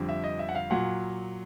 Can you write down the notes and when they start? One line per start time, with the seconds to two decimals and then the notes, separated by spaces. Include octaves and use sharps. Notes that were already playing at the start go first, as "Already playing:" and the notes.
Already playing: F2 D3 G3
0.09 E5
0.24 D#5
0.39 E5
0.49 F#5
0.55 F5
0.70 A#2 F#3 F#5